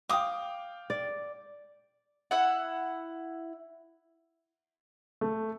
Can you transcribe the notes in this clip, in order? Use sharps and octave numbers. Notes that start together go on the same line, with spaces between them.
F5 G5 D6 D#6
D5
E4 F#5
A3